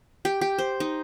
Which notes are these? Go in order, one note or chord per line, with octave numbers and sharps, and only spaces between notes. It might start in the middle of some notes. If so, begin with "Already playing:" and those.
G4
G4
C5
D#4